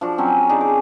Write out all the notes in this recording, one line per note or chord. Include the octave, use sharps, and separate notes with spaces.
F3 D4 F#4
F#3 C4 C#4
A4
D4 D#4 G#4
D6